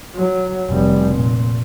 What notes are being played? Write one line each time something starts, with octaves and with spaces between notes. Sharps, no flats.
F#3
F1 G3
A#2